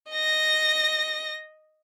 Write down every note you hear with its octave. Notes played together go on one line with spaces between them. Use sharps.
D#5 A#6